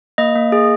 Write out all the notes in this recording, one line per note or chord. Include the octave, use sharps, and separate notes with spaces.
A#3 D#5
A#3
G#4